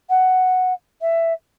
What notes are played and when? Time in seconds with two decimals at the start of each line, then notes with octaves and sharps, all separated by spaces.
0.10 F#5
1.01 E5